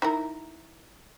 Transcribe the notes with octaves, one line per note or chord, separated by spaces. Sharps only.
D#4 E4 A#4